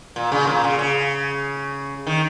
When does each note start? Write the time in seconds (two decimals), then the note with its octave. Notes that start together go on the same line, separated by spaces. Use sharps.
0.16 A#2
0.32 C#3
0.47 A#2
0.64 C#3
0.79 C#3
2.07 D#3